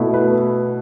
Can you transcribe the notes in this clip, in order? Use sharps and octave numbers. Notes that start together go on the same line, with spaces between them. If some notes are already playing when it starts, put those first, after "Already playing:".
Already playing: B2 A3 E4
B4